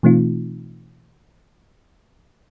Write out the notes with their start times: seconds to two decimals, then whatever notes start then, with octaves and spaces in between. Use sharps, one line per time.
0.03 B2 E3 A3 C4 D#4 F4